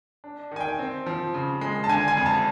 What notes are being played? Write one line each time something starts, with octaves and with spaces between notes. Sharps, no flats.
D4
D#3 G#5
G5
C4
F3
C#3
G#3
A5
D3 G#5
G#5
F2
A5